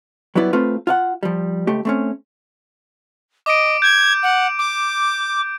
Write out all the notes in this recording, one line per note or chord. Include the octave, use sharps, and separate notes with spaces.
F#3 G3 B3 E4 D5
A3 C4 F4 B4
F4 F5 F#5
F3 G3
C#2 A3 G4
A3 C4 C#4
D#5 D6 D7
G6 G#6
F#5
D6